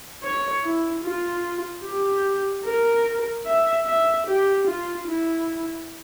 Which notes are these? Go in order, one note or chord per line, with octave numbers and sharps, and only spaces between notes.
C#5
E4
F4
G4
A#4
E5
E5
G4
F4
E4